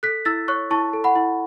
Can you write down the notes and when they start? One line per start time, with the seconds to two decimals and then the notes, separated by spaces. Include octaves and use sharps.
0.03 A4 F#6 B6
0.25 E4 E6 A6
0.48 C#5 C#6 F#6
0.70 E4 A5 C#6
0.93 A4
1.04 F#5 B5
1.16 E4